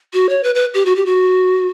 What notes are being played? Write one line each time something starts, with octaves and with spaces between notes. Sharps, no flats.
F#4
C#5
B4
B4
G4
F#4
G4
F#4